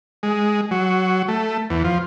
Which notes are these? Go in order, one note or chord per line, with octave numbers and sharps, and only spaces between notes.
G#3
F#3
A3
E2
F3